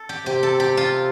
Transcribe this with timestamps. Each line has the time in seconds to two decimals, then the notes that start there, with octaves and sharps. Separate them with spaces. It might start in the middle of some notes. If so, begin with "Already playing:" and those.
Already playing: A4
0.09 G4
0.26 C3 G4
0.43 A4
0.60 G4
0.77 F4